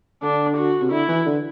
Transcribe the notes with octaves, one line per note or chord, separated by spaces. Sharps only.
D3 D4
F#4
C3
D3 E4
E3
D3